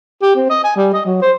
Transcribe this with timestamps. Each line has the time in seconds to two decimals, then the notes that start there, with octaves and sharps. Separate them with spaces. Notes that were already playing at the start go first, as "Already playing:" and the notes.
0.22 G4
0.36 C4
0.50 D#5
0.64 G#5
0.76 G3
0.94 D#5
1.06 F#3
1.22 C5